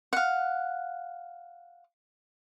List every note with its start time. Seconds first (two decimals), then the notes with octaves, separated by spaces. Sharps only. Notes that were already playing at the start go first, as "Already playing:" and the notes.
0.13 F5 F#5